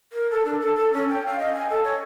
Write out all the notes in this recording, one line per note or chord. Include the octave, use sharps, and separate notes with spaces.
A#4
A4
D4
A4
A4
C#4
G5
F5
D#5
G#5
A4
C#5